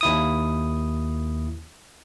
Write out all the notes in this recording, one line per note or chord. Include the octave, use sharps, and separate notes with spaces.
D#2 E4 D#6